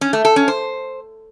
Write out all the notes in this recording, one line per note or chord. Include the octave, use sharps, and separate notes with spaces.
C#4
A3
A4
C#4
C5